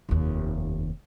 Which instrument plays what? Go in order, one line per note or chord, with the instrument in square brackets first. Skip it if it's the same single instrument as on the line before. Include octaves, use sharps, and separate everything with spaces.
[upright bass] F1 D#2